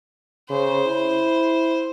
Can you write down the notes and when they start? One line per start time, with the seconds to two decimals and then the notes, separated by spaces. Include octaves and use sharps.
0.50 C#3 C5
0.88 E4